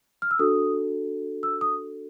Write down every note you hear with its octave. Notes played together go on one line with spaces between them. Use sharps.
F6
E6
D4 F#4 A4 D#6
E6
D#6